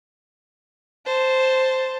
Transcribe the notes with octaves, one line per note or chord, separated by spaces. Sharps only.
C5 A5